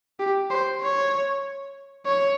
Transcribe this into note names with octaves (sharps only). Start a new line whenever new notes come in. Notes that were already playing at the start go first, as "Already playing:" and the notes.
G4
C5
C#5
C#5